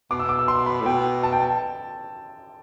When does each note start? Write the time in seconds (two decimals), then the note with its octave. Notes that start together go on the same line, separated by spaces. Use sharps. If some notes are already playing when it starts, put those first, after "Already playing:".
0.11 B2 D6
0.20 E6
0.29 D6
0.39 E6
0.48 C6
0.66 B5
0.81 A2
0.86 B2 G5
1.23 A5
1.32 G5
1.40 A5